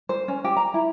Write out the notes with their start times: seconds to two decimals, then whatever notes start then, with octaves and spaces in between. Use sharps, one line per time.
0.09 C5
0.28 C#4
0.44 G4
0.57 A#5
0.74 E4